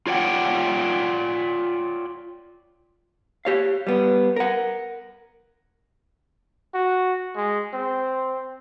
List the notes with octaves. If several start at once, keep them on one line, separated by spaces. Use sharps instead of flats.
F4 C#5 D5 F#5 G5
G4 C#5 F5
G3 B3
A#4 F#5
F#4
G#3
C4